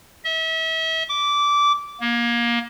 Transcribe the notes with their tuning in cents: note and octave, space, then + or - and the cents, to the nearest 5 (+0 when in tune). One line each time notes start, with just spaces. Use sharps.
E5 -35
D6 -15
A#3 +25